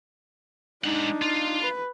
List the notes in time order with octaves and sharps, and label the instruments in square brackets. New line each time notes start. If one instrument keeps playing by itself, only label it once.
[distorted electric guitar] G#3 F#5 [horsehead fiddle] D4 D#4
[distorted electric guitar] F4
[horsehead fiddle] B4